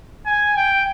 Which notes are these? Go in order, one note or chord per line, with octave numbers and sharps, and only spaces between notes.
G#5
G5